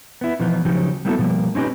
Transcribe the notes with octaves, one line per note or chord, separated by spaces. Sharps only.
B3 E4
B2 E3 F3 B3 D#4
C#3 F3 F#3 D#4 G4
G3 A#3 B3 E4 F#4 A4
B2 F3 G3 A#3
C4 C#4 D#4 G4 B4